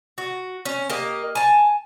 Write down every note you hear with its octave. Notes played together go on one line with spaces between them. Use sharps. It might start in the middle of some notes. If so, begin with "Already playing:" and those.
F#4
C#4
A#3 G4 D#5
G#5 A5